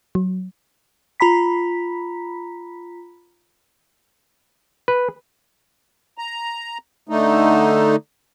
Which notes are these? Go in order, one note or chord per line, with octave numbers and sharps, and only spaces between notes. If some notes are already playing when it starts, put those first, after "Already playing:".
F#3
F4 A#5 B5 B6
B4
A#5
D3 A3 D#4